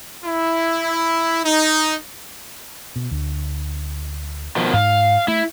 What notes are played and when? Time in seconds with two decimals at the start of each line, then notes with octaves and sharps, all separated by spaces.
0.25 E4
1.44 D#4
2.96 B2
3.11 D2
4.56 B2 D#3 F3
4.73 G#2 F5
5.28 A3 E4